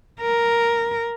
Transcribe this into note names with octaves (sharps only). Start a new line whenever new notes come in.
A#4